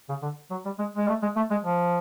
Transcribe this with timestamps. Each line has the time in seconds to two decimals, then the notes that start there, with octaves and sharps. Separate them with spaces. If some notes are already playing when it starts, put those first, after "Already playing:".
0.09 C#3
0.22 D3
0.51 F#3
0.65 G3
0.79 G#3
0.97 G#3
1.08 A3
1.22 G#3
1.36 A3
1.51 G#3
1.64 F3